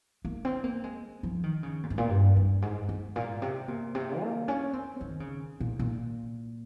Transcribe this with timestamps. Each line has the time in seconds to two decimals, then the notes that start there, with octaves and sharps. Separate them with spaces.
0.25 A#3
0.45 C4
0.64 A#3
0.84 G#3
1.23 F3
1.43 D#3
1.63 C#3
1.83 A#2
1.90 G#2
1.98 A#2
2.10 G2
2.37 G2
2.62 G#2
2.89 G#2
3.16 A#2
3.42 C3
3.68 A#2
3.95 C3
4.22 A#3
4.48 C#4
4.73 C4
5.01 D#3
5.20 C#3
5.60 A#2
5.79 A#2